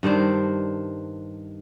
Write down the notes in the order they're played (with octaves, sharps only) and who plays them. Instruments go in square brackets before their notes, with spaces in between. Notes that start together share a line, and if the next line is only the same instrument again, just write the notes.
[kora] G2 D#3 D4 C5